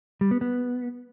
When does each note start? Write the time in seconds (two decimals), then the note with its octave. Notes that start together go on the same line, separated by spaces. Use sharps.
0.21 G3
0.31 B3
0.41 B3